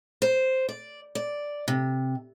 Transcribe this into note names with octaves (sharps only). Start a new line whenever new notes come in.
C5
D5
D5
C3